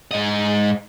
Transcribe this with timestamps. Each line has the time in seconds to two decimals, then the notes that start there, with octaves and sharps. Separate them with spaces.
0.11 G#2 D#5